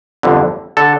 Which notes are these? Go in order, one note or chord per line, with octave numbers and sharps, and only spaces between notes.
G1 F2 D3
D3 A4